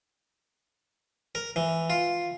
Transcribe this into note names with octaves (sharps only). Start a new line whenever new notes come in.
A#4
E3
F4